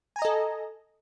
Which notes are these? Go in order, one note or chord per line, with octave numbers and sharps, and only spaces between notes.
A4 D#5 G#5 A#5